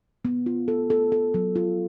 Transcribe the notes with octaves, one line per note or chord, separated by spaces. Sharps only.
B3
F4
A4
A4
A4
F#3
F4